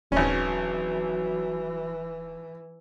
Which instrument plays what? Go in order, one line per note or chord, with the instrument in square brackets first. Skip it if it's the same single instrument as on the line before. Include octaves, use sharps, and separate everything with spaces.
[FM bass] D#1 [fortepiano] G#1 C#4 [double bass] E3 [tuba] F#3